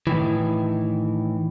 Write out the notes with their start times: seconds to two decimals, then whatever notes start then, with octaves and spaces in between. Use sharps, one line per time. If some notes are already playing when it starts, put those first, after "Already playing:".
0.07 A2 D#3 E3